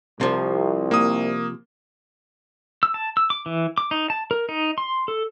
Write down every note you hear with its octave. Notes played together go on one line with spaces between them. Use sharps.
C2 C3 F3
A#3 D#6
E6
A5
E6
D6
E3
D6
D#4
A5
A#4
D#4
C6
A4